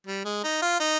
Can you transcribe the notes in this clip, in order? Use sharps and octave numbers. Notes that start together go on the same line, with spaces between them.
G3
G#3
D#4
F4
D#4